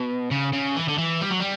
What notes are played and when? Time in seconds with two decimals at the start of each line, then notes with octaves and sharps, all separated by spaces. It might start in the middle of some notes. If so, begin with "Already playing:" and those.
Already playing: B2
0.32 C#3
0.53 C#3
0.76 E3
0.89 D3
0.98 E3
1.21 G3
1.30 F#3
1.40 G3